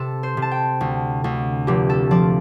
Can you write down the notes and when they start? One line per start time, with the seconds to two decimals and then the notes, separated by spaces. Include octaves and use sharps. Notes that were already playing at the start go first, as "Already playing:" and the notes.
Already playing: C3 A4
0.23 C5
0.37 C3
0.42 A5
0.51 G5
0.81 D2
1.24 D2
1.67 F1 G4
1.89 A4
2.11 F3 D5